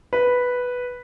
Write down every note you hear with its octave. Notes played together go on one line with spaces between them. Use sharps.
B4